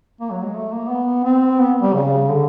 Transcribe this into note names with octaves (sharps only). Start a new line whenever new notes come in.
A#3
F#3
G#3
A3
A#3
B3
C4
B3
G3
C#3
D3